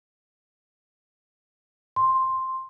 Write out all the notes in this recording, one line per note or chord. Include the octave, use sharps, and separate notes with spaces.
C6